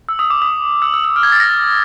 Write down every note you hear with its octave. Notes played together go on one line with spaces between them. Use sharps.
E6
D#6
D6
D#6
E6
E6
E6
F6
G#6
A6
A#6
A6